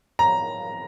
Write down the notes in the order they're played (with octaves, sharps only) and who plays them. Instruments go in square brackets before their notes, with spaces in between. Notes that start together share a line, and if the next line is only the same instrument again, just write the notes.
[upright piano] A#5